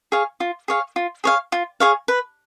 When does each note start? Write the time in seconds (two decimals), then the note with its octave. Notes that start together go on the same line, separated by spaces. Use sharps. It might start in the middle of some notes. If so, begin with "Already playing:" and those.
0.12 G#4 C#5 F5
0.40 F4
0.68 G#4 C#5 F5
0.96 F4
1.24 G#4 C#5 F5
1.52 F4
1.80 G#4 C#5 F5
2.08 B4